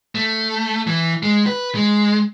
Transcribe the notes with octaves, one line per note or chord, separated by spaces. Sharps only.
A3
E3
G#3
B4
G#3